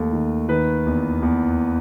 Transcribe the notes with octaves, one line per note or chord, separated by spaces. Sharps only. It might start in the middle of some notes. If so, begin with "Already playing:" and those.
Already playing: D#2 A3
D#3
D#3 B4
E2
E2